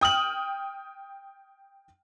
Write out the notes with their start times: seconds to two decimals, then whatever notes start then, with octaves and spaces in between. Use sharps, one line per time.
0.01 G5 D#6 F6 F#7